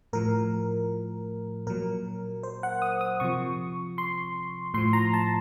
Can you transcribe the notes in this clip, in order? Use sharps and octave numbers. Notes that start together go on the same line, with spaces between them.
A2 F3 A#4
A#2 F#3 A#4
C5
F#5
D#6
D#6
C3 F3 C#6
C6
A2 F3 C6
A#5
A5